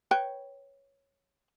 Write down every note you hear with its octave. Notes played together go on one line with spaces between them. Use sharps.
B4 C#5 G5